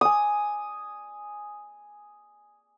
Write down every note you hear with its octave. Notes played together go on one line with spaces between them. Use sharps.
G#5 D#6